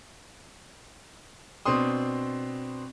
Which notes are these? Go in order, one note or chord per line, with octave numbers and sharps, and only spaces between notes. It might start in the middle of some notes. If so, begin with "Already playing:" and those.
B2 C4 D4 C6 D#6